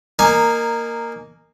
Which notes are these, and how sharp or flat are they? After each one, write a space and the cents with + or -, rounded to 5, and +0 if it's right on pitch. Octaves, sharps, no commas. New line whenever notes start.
A#3 -5 D#4 -15 G#5 +5